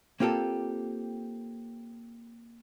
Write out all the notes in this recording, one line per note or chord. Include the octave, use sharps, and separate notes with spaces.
A#3 C4 F4 G4 A4